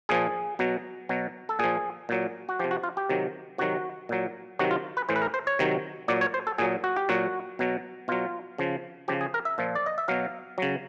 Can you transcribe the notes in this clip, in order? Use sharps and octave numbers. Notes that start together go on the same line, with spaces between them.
A#2 F3 G#4
B2 F#3
B2 F#3
A4
A#2 F3 G#4
A#2 F#3
F#4
C3 F3 G4
F#4
F4
G4
C3 D#3 F#3
C3 D#3 F#3 F#4
A#2 F#3
C3 D#3 F#3 F#4
F4
B4
A2 E3 C5
B4
A#4
C5
C#5
C3 D#3 F#3
A#2 F#3 D5
C#5
C5
A4
A#2 F#3 G#4
F#4
G4
A#2 F#3 F#4
B2 F#3
B2 F#3 F4
C#3 F3
C#3 F3 G4
G#4
A#4
E5
A#2 F3
D5
D#5
E5
B2 F#3 F5
C#3 F#3